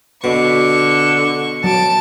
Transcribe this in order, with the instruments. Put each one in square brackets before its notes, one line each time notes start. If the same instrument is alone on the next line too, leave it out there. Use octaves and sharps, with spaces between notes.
[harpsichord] B2 [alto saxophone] D3 [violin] C#6
[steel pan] F#3 [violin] A5 D7